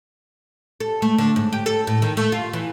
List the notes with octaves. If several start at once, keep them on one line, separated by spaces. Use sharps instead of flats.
A4
A3
D3
G#2
G4
A4
A2
D#3
A3
F4
E3